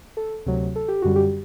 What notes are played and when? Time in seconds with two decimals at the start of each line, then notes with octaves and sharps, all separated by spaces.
0.17 A4
0.46 D2 C3 F#3
0.76 A4
0.88 G4
1.02 F#2 D3 G3 F#4
1.16 G4